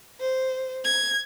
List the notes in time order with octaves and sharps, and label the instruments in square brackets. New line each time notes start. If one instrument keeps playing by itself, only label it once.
[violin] C5
G#6